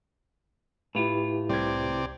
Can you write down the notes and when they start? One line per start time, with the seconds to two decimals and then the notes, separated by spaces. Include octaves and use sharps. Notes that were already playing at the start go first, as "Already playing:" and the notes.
0.95 A2 E4 F4 G4 B4
1.50 C2 C3 C4 D5 G#6